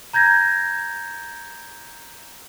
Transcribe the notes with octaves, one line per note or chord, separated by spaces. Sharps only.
A#5 G6 G#6 A#6